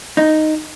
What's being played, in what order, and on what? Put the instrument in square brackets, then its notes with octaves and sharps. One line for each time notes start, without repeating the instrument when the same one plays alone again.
[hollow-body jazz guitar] D#4